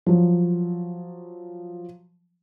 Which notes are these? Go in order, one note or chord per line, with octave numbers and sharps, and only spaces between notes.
F3 F#3